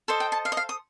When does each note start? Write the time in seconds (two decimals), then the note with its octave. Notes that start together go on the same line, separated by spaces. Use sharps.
0.08 A4 C5 D#5
0.20 G5
0.32 A5
0.45 F5
0.52 D#5
0.57 F5
0.69 D#6